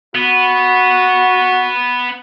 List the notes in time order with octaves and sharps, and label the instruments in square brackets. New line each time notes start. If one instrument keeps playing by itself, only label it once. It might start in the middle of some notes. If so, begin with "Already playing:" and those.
[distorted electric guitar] B3 [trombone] F#4